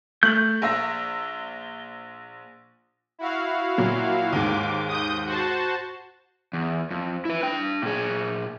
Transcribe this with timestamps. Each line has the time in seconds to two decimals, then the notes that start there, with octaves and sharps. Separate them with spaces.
0.23 A3 G6 F#7
0.62 A#1 E5 A#6
3.19 E4 F#4 F5
3.78 A#2 F#3
4.32 D#2 G#2 D6
4.88 D#6 G6
5.25 F#4 C5 A5
6.53 E2
6.90 F2
7.25 E4 B4
7.43 D4 G5
7.82 A#2 G#4